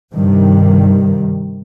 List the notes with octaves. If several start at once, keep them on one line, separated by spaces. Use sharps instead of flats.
G2 C3 D#3 G3